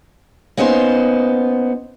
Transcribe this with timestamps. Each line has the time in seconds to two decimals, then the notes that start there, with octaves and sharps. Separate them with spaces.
0.57 A#3 B3 C#4 D#4 C5